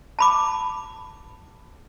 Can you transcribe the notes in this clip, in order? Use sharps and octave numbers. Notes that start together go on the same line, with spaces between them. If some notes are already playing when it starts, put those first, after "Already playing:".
A5 B5 D6